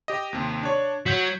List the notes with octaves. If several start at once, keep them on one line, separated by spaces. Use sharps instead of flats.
G4 D#5
D#2 C3
D4 C#5
F#3 G6 B6